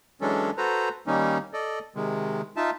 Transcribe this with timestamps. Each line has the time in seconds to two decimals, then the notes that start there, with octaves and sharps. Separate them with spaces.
0.21 E3 F#3 G#3 C#4 D4 A4
0.58 F#4 A4 B4 C5 A#5
1.07 D#3 G3 A#3 C#4 D#4
1.53 A4 D5 D#5
1.96 C3 D#3 G#3
2.57 D#4 F4 E5 A5